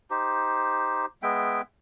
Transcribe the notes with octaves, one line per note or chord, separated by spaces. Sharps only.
D#4 G4 C5
G#3 B3 E5 G5